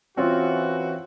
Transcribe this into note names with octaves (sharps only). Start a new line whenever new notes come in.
E3 C4 C#4 F4 F#4